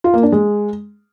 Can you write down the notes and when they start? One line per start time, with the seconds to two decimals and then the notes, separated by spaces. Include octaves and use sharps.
0.04 F4
0.14 A#3
0.23 D4
0.32 G#3